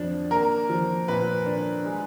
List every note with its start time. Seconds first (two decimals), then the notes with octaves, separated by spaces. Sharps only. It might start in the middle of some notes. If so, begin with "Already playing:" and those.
Already playing: F2 F3 D4
0.31 A#3 A#4
0.69 F3
1.08 A#2 B4
1.46 D4
1.85 G#3